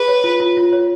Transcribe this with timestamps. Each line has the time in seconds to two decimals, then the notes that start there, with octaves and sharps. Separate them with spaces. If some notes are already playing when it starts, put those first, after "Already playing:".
Already playing: G#4 B4
0.08 C#5
0.24 F4
0.40 F4
0.57 F4
0.73 C#5